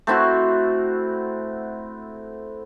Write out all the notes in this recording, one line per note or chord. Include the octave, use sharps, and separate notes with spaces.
A3 C4 E4 F#4